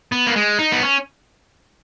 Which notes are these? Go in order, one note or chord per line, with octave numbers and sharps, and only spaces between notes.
B3
A#3
G#3
D#4
B3
C#4